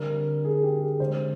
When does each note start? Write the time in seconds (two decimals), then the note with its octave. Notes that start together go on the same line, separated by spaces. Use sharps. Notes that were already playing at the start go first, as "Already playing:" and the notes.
Already playing: D3 G3 C4 A#4
0.45 G#4
0.63 G4
0.81 G#4
1.00 D3 G#3 C4 C5